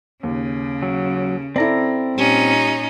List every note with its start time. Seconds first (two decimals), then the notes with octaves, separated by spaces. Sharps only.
0.23 D#2 C#3
0.83 F#3
1.56 C4 E4 A4 D5 A#5
2.17 A#2 G3 C#4 D#4